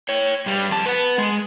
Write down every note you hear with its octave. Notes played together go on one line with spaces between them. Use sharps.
C#5 G5
G2 G3
F2 A5
B4 F#5
G#3